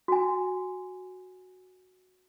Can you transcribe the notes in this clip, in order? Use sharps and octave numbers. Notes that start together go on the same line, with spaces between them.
F#4 G#5